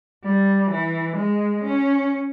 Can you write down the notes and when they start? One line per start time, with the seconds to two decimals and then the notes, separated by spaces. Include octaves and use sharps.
0.24 G3
0.71 E3
1.17 G#3
1.64 C#4